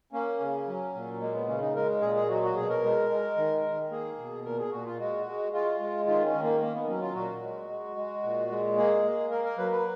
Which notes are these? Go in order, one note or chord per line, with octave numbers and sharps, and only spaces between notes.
A#3 C#4
C#3
F#3
A#2
G#3 A#3
B3
C#3 C#4
D#4
G#3 A#4
A#2 G#4
G#4
F#3 F#4
F#4
B2 G#4
A#4
G#3
G#3
D#3
D#3
A#3 G#4
B2
A#2 A#4
G#4
A#2 F#4
F4
G#3 F#4
G#3
G#3 F4
G#3
D#3 F4
C#4
D#3
A#3
A#3
B3
F#3 C#4
F4
A#2 F#4
G#3
G#3
G#3
A#2
G#3
A#3 G#4
A#3
A#3 A#4
A#4
F#3 B4
B4